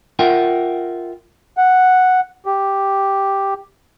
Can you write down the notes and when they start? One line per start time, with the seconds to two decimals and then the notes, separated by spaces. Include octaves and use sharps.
0.19 F4 A#4 E5 F#5 G5
1.57 F#5
2.46 G4